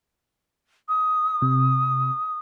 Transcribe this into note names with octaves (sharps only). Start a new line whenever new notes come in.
D#6
C3